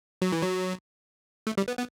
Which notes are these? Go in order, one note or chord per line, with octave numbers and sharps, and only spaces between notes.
F#3
E3
F#3
A3
G3
B3
B3